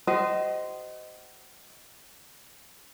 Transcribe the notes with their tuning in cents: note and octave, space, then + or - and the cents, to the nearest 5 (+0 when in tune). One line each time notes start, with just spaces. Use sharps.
F#4 +45 C5 -15 D#5 +0